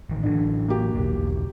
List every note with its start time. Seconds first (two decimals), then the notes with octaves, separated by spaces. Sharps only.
0.10 A1 D#3
0.23 A2 D3 E3 F#3
0.68 A#3 F#4 G4
0.94 F#1 B1 E2